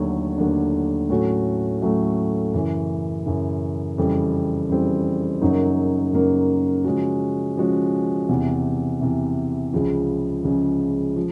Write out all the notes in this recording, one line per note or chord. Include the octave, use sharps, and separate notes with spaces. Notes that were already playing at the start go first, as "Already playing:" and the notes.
Already playing: D#2 D3 F#3 A3 D4
D#2 D3 F#3 A3 D4
A2 F#3 A3 C#4 F#4
A2 F#3 A3 C#4 F#4
F#2 C#3 E3
F#2 C#3 E3
F2 C#3 E3 G3 C4
F2 C#3 E3 G3 C4
F#2 C#3 F#3 A#3 D#4
F#2 C#3 F#3 A#3 D#4
C#3 F3 G#3 C#4 F#4
C#3 F3 G#3 C#4 F#4
E2 C3 E3
E2 C3 E3
C#2 C#3 F3
C#2 C#3 F3
F3